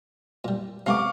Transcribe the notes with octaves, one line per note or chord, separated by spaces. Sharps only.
A#2 G3
C3 G#3 B3 F5 C#6 D6